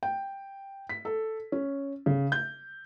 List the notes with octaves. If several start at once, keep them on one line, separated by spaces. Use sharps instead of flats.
G5
B6
A4
C#4
C#3
G6